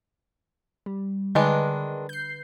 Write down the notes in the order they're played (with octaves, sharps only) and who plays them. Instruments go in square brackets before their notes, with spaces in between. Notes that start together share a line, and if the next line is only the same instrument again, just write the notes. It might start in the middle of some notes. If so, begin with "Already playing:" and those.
[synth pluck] G3
[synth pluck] D3 B4 [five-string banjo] D#3 G#3 D4
[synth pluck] G6 C7